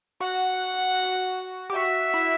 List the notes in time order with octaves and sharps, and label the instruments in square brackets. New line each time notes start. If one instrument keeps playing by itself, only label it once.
[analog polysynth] F#4 [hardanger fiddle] F#5
[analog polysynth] G4
[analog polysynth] F#4 [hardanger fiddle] E5
[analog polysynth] E4